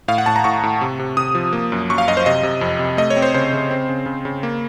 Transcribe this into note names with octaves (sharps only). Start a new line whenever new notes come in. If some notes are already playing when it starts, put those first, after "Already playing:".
A2 F5
F#5
A2 A5
A#5
A2 C#6
A2
C3
C3
C3 D#6
F3
A#3
F#2
F#2 C#6
F5
F#2 D#5
C5
C3 D#5
C3
F2
C3
A3 D#5
C#5
C4
C5
C#3 C5
C#3
C4
C#3
C#3
C#3
A#3